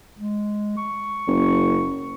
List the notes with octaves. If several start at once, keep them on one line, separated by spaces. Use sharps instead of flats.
G#3
C#6
F#1